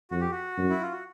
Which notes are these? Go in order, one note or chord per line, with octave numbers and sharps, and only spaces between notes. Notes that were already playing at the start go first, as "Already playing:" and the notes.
F2 F#4
G4
F#4
F#2
E4
F4
F#4